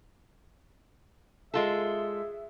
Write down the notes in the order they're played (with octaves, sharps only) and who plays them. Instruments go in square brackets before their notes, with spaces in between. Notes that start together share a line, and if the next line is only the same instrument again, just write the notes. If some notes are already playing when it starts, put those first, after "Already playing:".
[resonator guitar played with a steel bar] G#3 F4 A4 [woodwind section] G#4 E5